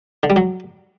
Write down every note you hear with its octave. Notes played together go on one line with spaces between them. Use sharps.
D3
G3
F#3